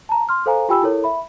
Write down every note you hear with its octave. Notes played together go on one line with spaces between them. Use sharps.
A5 A#5
C6 F6
A4 C5 F5 G#5 A#5
F4 G4 G5 G#5 B5 E6
E4 A4 A#4 C#5
E5 B5